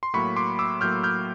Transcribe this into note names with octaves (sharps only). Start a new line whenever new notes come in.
C6
A2 F#3 A#3 B5 C#6
C6 D6
D6 E6
A2 F#3 A#3 F6 G6
F6 G6